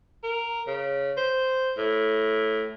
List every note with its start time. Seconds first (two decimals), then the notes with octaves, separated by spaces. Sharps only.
0.24 A#4
0.67 C#3
1.17 C5
1.77 A2